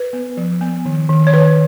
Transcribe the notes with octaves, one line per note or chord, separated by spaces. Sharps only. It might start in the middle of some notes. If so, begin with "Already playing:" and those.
Already playing: B4
B3
F3
B3
D#3
D#3
C#5
D#3 B4